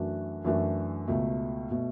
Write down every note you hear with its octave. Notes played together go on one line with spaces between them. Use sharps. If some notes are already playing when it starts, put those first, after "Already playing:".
Already playing: F#2 E3 A3 D4 F#4
F#2 E3 A3 D4 F#4
C#2 B2 A3
B2 A3